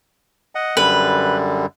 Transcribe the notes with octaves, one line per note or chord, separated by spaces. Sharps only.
D#5 F#5
F#2 D3 G3 B4